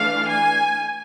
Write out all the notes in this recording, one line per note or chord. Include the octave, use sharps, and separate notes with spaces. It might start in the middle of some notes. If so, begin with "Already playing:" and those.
Already playing: E3 A3 D4 F5
G#5